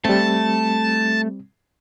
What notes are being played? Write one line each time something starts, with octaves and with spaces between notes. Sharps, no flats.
G3 A3 C4 A5